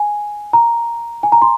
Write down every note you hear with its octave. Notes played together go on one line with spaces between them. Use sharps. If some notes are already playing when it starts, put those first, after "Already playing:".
Already playing: G#5
A#5
G#5
A#5
C6